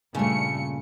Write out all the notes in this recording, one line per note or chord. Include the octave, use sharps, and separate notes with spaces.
G2 A#2 C#3 A3 C#7